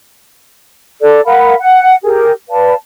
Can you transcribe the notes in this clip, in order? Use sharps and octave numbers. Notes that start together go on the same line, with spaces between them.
A4 D5
A#4 F5 F#5 B5
F#5
G4 G#4 A#4
B4 D5 F5 A5